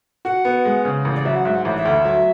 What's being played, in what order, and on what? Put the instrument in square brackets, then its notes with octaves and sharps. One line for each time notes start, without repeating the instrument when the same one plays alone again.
[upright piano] F#4 [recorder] F#5
[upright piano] B3
G#3
C#3
A1
[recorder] D5
[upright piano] F#3 [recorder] E5
[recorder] F#5
[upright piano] G#2 [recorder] E5
[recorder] F#5
[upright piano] A1 [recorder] E5
[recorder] E5
[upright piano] D2
F#3